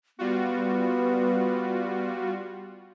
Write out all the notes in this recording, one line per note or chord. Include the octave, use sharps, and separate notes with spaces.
G3 B3 F4 F#4